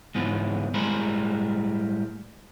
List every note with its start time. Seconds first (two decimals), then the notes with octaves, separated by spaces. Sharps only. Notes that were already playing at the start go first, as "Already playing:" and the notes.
0.15 E2 G#2 F3 B3
0.74 A2 G3 G#3 A#4 C5 B5